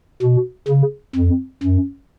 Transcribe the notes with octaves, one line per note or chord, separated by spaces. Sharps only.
B2
C#3
F2
F#2